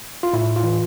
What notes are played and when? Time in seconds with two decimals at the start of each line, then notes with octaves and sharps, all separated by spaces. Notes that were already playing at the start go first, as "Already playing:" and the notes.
0.23 F4
0.33 A2 E4
0.56 F4
0.63 E3